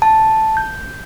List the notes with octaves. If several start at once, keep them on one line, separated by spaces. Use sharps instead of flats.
A5
G6